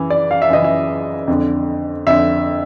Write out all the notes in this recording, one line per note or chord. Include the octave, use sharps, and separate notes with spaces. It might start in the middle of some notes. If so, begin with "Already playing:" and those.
Already playing: F#2 C#3 E3
D5
F5
E5
F#2 C#3 E3 D#5
E5
F2 D3
F2 D3 E5